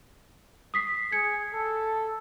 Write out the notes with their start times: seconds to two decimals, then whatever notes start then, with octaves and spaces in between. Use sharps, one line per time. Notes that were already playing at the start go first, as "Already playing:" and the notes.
0.74 D#6 B6 C7
1.12 G#4 G#6 C#7
1.53 A4